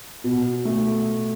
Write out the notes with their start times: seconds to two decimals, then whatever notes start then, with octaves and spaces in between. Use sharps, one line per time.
0.24 B2
0.65 A3